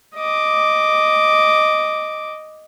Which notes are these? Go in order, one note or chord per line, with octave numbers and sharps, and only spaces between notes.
D#5 D6